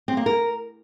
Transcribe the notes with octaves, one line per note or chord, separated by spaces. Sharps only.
C4
A#3
A#4